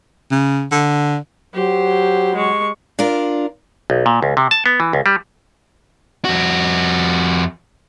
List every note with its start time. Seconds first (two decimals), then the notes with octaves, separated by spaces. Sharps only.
0.31 C#3
0.71 D3
1.54 F#3 G4 C5
2.35 G#3 C#6
2.99 D4 F4 A#4
3.90 B1
4.06 A#2
4.22 C#2
4.37 C3
4.51 A5
4.66 B3
4.80 E3
4.93 C#2
5.06 G3
6.25 F2 F#4